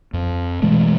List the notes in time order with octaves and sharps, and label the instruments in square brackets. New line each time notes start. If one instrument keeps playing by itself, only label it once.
[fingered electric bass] F2
B2 E3 G#3 A3